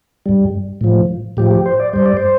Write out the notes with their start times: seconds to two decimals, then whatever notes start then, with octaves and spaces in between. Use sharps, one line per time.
0.26 G2 G3
0.81 A2 F3
1.37 A2 F3 G4
1.51 G4
1.66 C5
1.80 D5
1.93 G2 G3 C5
2.06 D5
2.17 C5